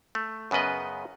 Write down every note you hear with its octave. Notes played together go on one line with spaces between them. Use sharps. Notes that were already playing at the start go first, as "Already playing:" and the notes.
A3
F#2 C#3 B3 B4 D#5